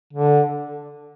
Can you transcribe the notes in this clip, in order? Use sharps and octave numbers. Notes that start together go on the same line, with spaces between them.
D3